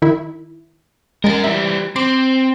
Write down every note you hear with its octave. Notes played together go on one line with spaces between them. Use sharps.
D#3 E4
G#3 C#4 A#4 A6
E3 G3 E5
C4 C6 D6